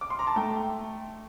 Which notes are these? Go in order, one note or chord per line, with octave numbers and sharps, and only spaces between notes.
D6
C6
A#5
A5
A3 G5